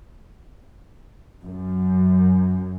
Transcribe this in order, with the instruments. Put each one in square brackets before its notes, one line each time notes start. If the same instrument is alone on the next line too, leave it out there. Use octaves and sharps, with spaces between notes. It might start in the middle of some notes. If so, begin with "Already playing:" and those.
[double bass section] F#2